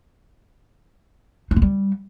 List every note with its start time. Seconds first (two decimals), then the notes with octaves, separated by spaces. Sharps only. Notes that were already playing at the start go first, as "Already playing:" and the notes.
1.51 D#4
1.56 G#3
1.62 G3